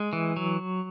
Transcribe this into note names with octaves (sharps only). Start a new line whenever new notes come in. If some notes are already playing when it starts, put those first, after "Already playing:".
Already playing: G#3
E3
F#3